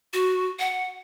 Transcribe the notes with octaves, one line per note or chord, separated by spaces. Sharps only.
F#4
F#5